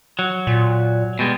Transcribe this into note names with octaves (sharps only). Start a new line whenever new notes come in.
F#3
A#2
B2 G3 G#3